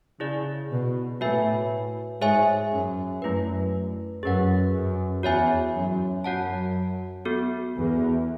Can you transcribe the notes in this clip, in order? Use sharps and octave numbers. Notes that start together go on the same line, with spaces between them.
C#3 E4 G#4 D5
B2
A2 F#4 B4 E5 G#5
G#2 G#4 C#5 E5 G#5
F#2
F#2 A3 E4 B4
F#2 G#4 B4 F#5
F#2
E2 F#4 C#5 E5 G#5
F#2
F#2 F#4 C#5 F#5 A5
B3 F#4 A4
E2